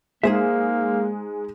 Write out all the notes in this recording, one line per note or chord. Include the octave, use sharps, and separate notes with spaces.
G#3 A#3 D#4 G#4 C5 E5